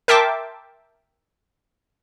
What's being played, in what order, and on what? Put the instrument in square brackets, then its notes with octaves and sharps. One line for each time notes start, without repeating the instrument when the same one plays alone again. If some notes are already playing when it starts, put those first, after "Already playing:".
[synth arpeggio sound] A#4 E5 G5 A5 C6 D6